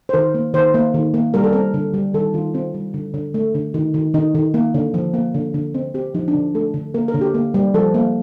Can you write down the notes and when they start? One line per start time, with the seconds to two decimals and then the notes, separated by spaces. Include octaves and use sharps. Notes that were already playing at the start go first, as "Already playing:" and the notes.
0.09 C5
0.14 D#3 A#4
0.34 A#3
0.54 D#3 C5
0.74 A#3
0.94 D#3
1.14 A#3
1.34 G3 A#4
1.44 A4
1.53 C4 A#4
1.74 D3
1.94 G3
2.14 D#3 A4
2.34 D#3 F4
2.54 C4 F4
2.74 G3
2.94 D3
3.14 D3
3.34 A3
3.55 D3
3.74 D#3
3.94 D#3
4.14 D#3 D#4
4.35 D#3
4.54 A#3
4.74 D3
4.94 F3
5.14 A#3
5.34 D3
5.54 D3
5.74 C4
5.94 C4 G4
6.14 F3 D#4
6.28 D4
6.35 D3
6.55 A3 A4
6.74 D3
6.94 A#3 A#4
7.08 A#4
7.14 D3
7.21 G4
7.35 A#3
7.54 G3
7.74 F3 A4
7.94 A#3